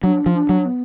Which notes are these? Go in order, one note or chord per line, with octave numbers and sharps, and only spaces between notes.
F#3 D4
F3
D4
F#3
B3